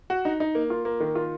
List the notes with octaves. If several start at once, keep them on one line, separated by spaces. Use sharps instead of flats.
F#4
D#4
D#4
A#3
F4
A#3
D#3
F4